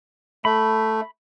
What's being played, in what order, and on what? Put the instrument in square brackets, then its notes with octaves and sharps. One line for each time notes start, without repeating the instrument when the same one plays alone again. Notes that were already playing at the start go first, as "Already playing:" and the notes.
[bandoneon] A3 [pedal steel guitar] B5